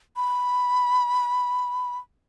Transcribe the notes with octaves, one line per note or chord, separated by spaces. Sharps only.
B5